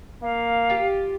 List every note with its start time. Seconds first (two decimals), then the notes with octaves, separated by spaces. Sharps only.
0.22 A#3 F5
0.70 F4 G4